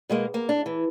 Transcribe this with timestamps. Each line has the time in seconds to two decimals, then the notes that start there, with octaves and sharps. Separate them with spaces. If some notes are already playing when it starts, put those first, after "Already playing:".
0.09 B2 G#3 A#3
0.34 A#3
0.49 D4
0.66 E3